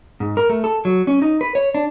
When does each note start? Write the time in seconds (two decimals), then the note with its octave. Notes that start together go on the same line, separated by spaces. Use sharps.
0.20 G#2
0.37 A#4
0.50 A3
0.64 A4
0.85 F#3
1.07 C#4
1.22 D#4
1.41 B4
1.55 C#5
1.75 D4